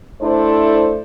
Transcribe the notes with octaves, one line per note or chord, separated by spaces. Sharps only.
A3 D4 E4 A4 C5